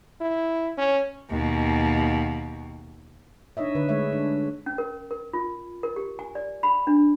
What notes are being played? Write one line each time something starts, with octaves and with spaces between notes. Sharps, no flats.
E4
C#4
D#2 B2
D4 D#4 C#5 D#5 E5
D3 B4
G#3 A3 C#5 E5
D4
C#4
A#4
A#4
F4
A#4
G4
G#5
D5
B5
D4